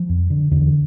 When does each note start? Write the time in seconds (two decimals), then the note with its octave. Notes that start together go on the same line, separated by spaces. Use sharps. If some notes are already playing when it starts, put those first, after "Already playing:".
Already playing: F3
0.09 F2
0.30 D3
0.51 E2 D3